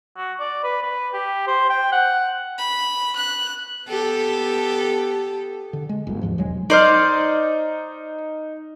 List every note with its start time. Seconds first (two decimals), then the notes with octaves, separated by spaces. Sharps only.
0.18 F#4
0.40 D5
0.64 B4
0.82 B4
1.13 G4
1.47 C5
1.70 G5
1.92 F#5
2.58 B5
3.16 F#6
3.88 B3 G4 A4
5.73 D3
5.89 G#3
6.07 G1 F#2
6.21 D#2 G#2 F3
6.38 E1 F#3 G#3
6.70 D#4 C5 D5 F6